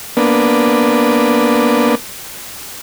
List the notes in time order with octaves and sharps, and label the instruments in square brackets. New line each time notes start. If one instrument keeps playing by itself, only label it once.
[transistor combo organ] A#3 B3 D4